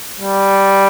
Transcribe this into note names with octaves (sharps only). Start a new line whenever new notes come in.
G3